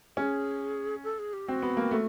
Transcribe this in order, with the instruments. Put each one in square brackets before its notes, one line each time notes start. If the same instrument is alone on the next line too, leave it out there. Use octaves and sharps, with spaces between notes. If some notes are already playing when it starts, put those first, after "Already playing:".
[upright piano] C#4 [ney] G#4
[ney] A4
G#4
G4
[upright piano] C4 [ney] F#4
[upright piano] B3
A#3
A3